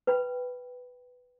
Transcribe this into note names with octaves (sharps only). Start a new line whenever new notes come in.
B4 G5 B5